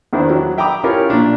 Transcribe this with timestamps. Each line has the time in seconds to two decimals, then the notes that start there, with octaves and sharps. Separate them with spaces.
0.13 E2 D#3 D4 E4 C5
0.30 F#3
0.58 E5 G5 A#5 B5 D6 D#6
0.84 C#4 E4 F4 G4 A#4
1.10 A#2 D4